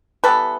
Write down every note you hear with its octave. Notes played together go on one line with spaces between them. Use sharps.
E3 G3 B3 A4 B4